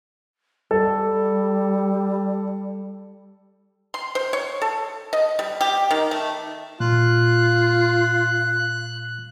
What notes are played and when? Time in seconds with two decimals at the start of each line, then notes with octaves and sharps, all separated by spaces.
0.71 G3 A4
3.94 C6
4.15 C5
4.33 C#5
4.62 A4
5.13 D#5
5.39 G3
5.61 G4
5.91 D#3
6.11 A3
6.80 A#2 F4 F#6